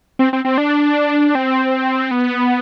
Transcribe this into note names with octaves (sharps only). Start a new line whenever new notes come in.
C4
C4
C4
D4
C4
B3